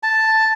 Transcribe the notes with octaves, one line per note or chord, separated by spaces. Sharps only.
A5